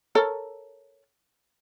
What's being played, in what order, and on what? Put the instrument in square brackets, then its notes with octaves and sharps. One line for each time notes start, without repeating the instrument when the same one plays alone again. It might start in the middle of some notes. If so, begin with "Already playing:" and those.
[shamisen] A4 A#4 C#5